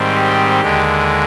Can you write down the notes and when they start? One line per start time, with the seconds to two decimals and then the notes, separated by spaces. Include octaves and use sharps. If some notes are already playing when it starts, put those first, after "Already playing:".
Already playing: G#2 D#3 G3 C4
0.14 G4
0.61 D#2 D3 G#3